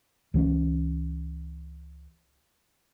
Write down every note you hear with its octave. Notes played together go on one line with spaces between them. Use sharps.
C#2 E3 A3 C#4